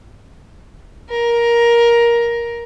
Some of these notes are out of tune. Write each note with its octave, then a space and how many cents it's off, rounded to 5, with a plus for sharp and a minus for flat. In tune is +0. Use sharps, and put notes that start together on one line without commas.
A#4 +10